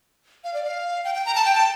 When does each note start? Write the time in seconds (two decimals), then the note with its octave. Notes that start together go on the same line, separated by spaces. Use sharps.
0.44 F5
0.54 D5
0.64 F5
1.04 G5
1.15 G5
1.26 A#5
1.35 A5
1.45 G5
1.55 A5